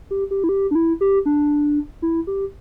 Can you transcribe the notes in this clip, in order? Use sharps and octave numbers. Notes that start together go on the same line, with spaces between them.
G4
G4
E4
G4
D4
E4
G4
D4
E4
G4